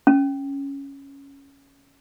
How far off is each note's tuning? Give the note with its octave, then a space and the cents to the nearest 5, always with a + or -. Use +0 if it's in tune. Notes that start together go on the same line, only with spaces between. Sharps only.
C#4 +0